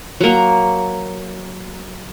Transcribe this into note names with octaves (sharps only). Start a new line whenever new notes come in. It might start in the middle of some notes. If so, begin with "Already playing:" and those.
F#3 A#3